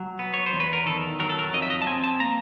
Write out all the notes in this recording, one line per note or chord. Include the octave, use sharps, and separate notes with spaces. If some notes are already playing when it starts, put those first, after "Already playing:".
Already playing: F#3
B3
C#5
C5
E2
B4
A#4
D#3 A4
F#3 A#4
A4
A#4
F2 D#5
E5
D#5
A5
C4 G#5
A5
A#3 A#5